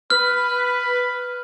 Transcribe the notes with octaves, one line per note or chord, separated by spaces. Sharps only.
B4 F6